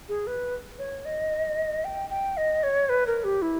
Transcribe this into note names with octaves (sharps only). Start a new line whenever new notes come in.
G#4
B4
C#5
D#5
G5
G5
D#5
C#5
B4
A#4
G4
E4